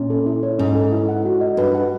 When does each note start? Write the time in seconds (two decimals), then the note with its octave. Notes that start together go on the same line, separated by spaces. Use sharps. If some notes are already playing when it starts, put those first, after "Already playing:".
Already playing: A#2 C#4
0.10 A4
0.26 E4
0.43 C#5
0.59 G#2 C#4
0.75 A4
0.92 E4
1.09 F#5
1.25 F#4
1.41 D#5
1.57 G2 B4
1.75 F#5